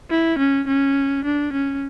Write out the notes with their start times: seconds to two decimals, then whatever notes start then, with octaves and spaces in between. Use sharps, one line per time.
0.10 E4
0.38 C#4
0.67 C#4
1.24 D4
1.53 C#4